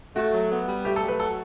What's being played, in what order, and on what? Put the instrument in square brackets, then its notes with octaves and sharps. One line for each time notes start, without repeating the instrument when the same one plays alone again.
[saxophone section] A3 [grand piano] F#4
[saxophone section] F#3
B3
G3
[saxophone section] A3 [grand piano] G4
[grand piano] A4
[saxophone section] F#3
[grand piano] B4
[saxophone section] F#4 [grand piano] A4